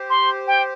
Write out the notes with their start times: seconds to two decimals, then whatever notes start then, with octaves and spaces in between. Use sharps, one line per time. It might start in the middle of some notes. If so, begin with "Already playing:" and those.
Already playing: G4 C5
0.10 C6
0.47 G5